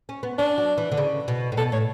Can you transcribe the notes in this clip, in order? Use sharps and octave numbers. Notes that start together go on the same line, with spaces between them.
C#4
B3
C#4 D4
F#3
E3
D3
C#3
B2
A2
B2 A4
A2 C#5